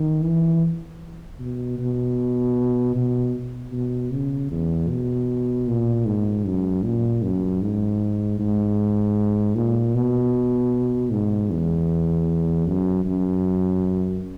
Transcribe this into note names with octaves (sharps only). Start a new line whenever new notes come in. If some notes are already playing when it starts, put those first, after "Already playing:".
Already playing: D#3
E3
B2
B2
B2
B2
C#3
E2
B2
A#2
G#2
F#2
A#2
F#2
G#2
G#2
A#2
B2
G#2
E2
F#2
F#2